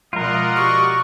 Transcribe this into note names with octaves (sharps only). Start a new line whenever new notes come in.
B2 F3 G#3 F4 A#4 D5 D#5 F#5
F#4 G4 C#6